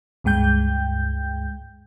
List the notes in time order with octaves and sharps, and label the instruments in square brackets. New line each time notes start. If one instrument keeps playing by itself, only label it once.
[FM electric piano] C#2 G2 G#3 G5 G6